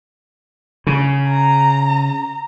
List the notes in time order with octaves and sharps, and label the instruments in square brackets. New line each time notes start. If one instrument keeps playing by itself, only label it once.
[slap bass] C#3
[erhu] A#5